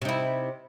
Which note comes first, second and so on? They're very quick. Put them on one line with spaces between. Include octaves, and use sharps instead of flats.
C3 D#4 E4